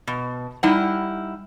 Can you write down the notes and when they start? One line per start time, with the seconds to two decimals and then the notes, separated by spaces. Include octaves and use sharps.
0.07 B2
0.63 G3 D#4 E4 F#5